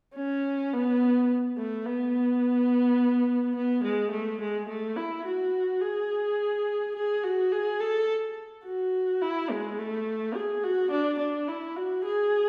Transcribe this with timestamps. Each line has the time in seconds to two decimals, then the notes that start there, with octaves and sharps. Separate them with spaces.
0.15 C#4
0.72 B3
1.57 A3
1.86 B3
3.56 B3
3.83 G#3
4.11 A3
4.41 G#3
4.69 A3
4.96 E4
5.25 F#4
5.81 G#4
6.95 G#4
7.23 F#4
7.52 G#4
7.80 A4
8.64 F#4
9.21 E4
9.50 G#3
9.78 A3
10.35 G#4
10.63 F#4
10.91 D4
11.19 D4
11.48 E4
11.76 F#4
12.04 G#4